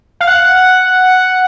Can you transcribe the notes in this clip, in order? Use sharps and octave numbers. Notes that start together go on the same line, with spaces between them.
F5
F#5